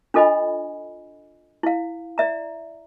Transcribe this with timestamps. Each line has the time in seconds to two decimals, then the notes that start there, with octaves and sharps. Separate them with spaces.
0.14 D4 F4 A4 D#5 G#5 B5
1.63 E4 F5
2.18 D5 E5 A#5